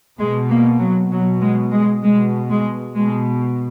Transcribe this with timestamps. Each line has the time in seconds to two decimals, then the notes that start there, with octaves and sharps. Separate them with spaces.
0.19 B2 G#3
0.50 A#3
0.80 F#3
1.12 B2 F#3
1.42 G#3
1.73 G#3
2.03 B2 G#3
2.49 G#3
2.96 B2 G#3